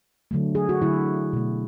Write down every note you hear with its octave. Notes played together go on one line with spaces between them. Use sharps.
D3 F#3 A3
G#4
F#4
D3 F#3 A3 E4
B2 A3